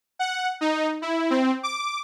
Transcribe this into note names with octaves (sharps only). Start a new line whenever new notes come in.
F#5
D#4
E4
C4
D6